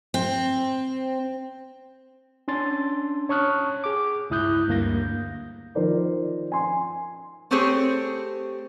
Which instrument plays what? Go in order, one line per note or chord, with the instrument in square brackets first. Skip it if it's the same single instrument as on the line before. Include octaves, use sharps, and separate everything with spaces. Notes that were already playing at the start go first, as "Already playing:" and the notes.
[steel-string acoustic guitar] C4
[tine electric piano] C#4 D4 C6 A6
C#5 A5 C#6 D#6 F6 F#6
G#4 D6
C#2 G2 E4 D#6 F#6 G6
D2 G2 A#3 G6 A#6
[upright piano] D#3 F3 A#4 C5 D5
G#5 C6
[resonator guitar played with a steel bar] A3 C4 G4 G#4 C5 C#5